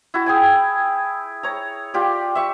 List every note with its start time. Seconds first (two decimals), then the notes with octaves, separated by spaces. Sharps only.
0.14 E4 F#4
0.26 G#4 G5 G#5
1.43 C#5 A#5
1.94 F4 G4 D5
2.35 E5 C#6